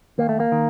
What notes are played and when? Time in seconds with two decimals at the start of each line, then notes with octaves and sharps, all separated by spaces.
0.18 D#2 A#3
0.29 A3
0.40 A#3
0.52 D#3